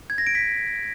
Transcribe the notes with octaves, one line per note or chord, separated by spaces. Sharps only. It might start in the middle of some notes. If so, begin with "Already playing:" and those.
G#6
A#6
D7
B6